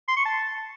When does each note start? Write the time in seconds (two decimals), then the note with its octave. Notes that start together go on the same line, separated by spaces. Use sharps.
0.08 C6
0.17 C#6
0.26 A5